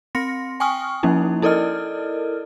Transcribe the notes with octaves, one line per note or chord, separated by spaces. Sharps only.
C4 C6 A#6 C#7
G5 G#5 C#6 D#6 F6
F3 A#3 C#4 D#4 E4
E4 A4 A#4 D5 D#5 F6